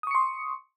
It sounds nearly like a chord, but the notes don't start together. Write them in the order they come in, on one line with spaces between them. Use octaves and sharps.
D#6 C#6 C#7 C6